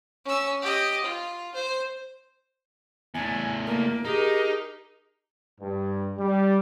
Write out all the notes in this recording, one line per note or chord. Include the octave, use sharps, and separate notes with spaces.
C#4 E6
G4 D#5
F4
C5
E2 A3 G#5
A#3 A#4
D#4 G4 G#4
G2
G3